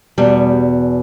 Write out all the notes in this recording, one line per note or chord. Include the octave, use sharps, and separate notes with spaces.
E2 B2 G3